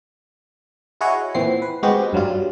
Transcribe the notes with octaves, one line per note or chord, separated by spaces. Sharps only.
E4 F#4 G#4 C#5 D#5 F#5
A#2 E3 C4 C7
B4
G#3 B3 C4 F#4 G4
G2 F#3 G3 F4